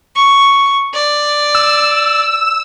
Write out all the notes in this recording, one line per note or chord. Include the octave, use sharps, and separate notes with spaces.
C#6
D5
E6